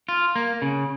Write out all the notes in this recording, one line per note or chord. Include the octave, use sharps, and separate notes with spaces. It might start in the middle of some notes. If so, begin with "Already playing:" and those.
F4
A#3
C#3